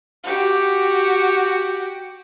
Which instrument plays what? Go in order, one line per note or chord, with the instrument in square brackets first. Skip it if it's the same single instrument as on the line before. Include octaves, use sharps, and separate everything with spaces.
[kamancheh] F#4 G4